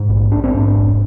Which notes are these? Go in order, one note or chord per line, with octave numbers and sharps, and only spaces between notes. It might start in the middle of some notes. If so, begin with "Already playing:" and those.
Already playing: G#2
A#1
A#1 D4
C4
G#2 D4
F1